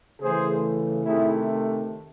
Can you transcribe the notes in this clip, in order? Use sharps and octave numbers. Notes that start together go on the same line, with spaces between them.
C#3 E3 A3 G#4 C5
C3 D#3 A3 E4 G#4